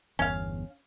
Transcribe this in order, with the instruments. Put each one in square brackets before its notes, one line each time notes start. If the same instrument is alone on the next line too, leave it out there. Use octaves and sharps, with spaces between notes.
[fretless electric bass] G1 E2 [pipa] C#4 F5